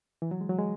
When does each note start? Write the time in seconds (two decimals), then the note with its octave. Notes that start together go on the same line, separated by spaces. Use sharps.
0.22 E3
0.31 F#3
0.41 G#3
0.49 F#3
0.59 G#3